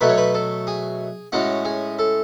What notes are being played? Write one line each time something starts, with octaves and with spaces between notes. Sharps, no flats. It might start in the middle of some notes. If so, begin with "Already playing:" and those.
B2 F#3 A3 B4
C#5
B4
A4
G#4
A2 G#3 C#4 F#4
G#4
A4